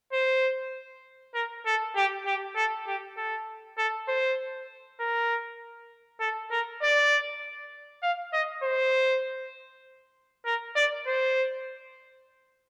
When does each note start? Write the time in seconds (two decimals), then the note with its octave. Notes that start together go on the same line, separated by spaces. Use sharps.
0.13 C5
1.34 A#4
1.66 A4
1.96 G4
2.26 G4
2.56 A4
2.87 G4
3.17 A4
3.78 A4
4.08 C5
5.00 A#4
6.20 A4
6.51 A#4
6.82 D5
8.03 F5
8.33 D#5
8.63 C5
10.45 A#4
10.75 D5
11.07 C5